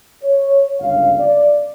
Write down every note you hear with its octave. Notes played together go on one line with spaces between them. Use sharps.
C#5
G1 C#2 F#2 C#4 F5
D5